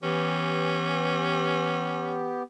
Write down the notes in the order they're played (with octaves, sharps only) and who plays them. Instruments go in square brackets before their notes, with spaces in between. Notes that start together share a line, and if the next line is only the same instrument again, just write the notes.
[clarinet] E3 [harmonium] B3 G4 [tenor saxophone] C#4